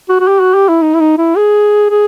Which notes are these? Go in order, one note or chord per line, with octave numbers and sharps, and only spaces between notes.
F#4
F#4
G4
F#4
G4
E4
D#4
E4
D#4
E4
G#4
G#4